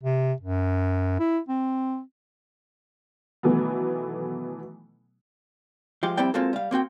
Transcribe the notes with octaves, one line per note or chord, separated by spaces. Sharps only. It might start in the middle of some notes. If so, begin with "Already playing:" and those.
C3
F#2
E4
C4
B2 D#3 E3 F#3 A3 B3
F3 G#3 G4
F2 G3 C4 E4 D5 G5
G#3 A#3 C4 F4 F#4 A4
G3 F5
A#3 C4 F#4 G5